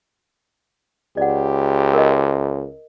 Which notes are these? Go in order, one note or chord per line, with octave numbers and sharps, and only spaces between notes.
C#2 G4 D5 F#5
A#4 D#5